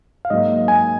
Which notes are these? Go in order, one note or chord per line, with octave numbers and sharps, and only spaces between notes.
F5
G#2 F#3 A#3 D#5
G#5